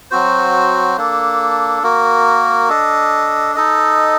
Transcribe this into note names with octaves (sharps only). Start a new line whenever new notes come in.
F#3 C4 F#4 C5
A#3 D4 A4
A#3 F#4 A#4
D4 A4 D#5
D#4 A4 D#5